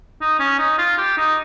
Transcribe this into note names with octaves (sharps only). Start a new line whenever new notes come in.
D#4
C#4
D#4
F4
G4
D#4